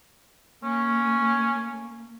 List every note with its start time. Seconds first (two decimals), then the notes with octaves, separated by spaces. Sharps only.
0.63 A#3 C#4